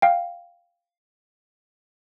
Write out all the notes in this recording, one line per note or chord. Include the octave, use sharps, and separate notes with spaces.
F5 G5